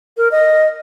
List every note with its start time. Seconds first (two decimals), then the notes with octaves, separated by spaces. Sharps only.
0.17 A#4
0.31 D#5